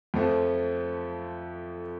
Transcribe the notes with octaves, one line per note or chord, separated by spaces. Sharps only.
F2 F3 A3